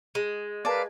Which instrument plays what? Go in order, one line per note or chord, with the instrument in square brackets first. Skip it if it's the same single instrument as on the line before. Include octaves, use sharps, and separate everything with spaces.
[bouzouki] G#3
[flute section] A#4 B4 F5 [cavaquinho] D5 A5